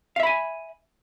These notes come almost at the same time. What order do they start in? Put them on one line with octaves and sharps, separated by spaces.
F5 E5 B5 G#5